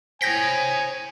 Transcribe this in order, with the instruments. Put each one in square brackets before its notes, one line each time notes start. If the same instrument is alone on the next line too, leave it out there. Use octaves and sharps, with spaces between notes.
[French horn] C5 [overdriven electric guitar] C#5 G5 [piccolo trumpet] G#5 [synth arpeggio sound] G6 A#6 B6